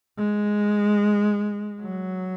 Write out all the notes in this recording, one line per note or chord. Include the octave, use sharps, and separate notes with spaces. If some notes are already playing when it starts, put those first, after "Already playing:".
G#3
F#3